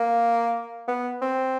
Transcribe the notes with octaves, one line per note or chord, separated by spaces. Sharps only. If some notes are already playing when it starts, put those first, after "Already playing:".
Already playing: A#3
B3
C4